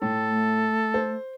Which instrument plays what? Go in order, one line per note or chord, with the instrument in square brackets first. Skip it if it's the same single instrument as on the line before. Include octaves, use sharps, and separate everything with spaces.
[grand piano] A2 [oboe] A4
[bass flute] A3
[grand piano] C5